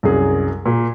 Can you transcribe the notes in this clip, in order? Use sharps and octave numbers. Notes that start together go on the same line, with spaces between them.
C2 F#2 G#4
A#2